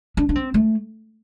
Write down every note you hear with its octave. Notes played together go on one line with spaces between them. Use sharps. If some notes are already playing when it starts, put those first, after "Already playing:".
D4
D4
C4
A3